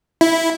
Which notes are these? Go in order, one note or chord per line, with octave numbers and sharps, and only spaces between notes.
E4